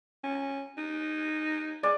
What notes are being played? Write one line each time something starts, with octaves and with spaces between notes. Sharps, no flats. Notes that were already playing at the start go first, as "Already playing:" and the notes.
C#4
D#4
G#3 D5